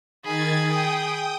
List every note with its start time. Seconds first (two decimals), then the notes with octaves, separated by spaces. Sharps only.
0.24 D#3 G#4 B5 G#6 A6
0.64 G5 D#6